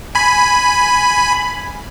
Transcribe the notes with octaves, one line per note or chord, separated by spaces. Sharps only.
G#5 B5